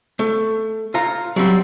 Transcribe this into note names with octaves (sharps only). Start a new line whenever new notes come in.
A3
F4 A#5
F#3 G3 C4